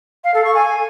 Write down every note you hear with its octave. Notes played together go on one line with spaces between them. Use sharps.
F5
A4
C#6
G#5